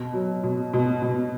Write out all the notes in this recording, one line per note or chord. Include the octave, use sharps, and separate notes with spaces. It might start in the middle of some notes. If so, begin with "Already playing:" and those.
Already playing: B2
F#3
B2
B2
B2